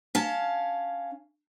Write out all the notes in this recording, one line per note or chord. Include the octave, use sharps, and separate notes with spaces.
C#4 F5 A5